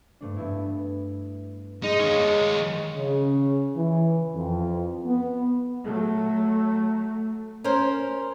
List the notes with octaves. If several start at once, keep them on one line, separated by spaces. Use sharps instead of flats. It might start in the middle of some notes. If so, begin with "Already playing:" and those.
G2 A3 D4
G2 B3 E4
G#3 D#4
D#3 C#5
C#3
E3
F2
B3
F#3 A3
C#4 A#4 C5